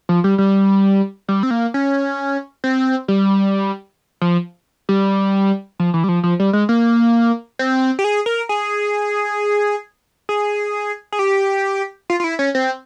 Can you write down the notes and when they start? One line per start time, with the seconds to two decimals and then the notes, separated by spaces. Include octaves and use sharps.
0.09 F3
0.24 G3
0.38 G3
1.29 G3
1.43 C4
1.51 A#3
1.74 C#4
2.64 C4
3.08 G3
4.22 F3
4.89 G3
5.80 F3
5.94 E3
6.04 G3
6.09 F3
6.23 F3
6.40 G3
6.53 G#3
6.69 A#3
7.59 C4
7.99 G4
8.04 G#4
8.26 A#4
8.49 G#4
10.29 G#4
11.12 G#4
11.19 G4
12.10 F4
12.20 F4
12.24 E4
12.39 C#4
12.55 C4